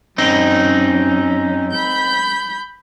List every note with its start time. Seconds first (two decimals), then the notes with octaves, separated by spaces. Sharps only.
0.18 F#2 C4 C#4 D#4
1.71 B5 G6